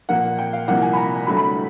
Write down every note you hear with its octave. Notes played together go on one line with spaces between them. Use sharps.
A#2 F3 A#3 F#5
G5
F5
C2 C3 F3 A#3 F#5
G#5
B5
A#5
G2 D3 F#3 A3 B5
B5